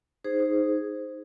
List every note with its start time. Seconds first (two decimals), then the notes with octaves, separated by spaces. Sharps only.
0.24 D#4 G#4 C5
0.40 D#4